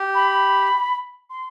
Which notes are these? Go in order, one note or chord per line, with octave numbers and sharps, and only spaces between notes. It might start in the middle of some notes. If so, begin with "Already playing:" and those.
Already playing: G4
B5
C6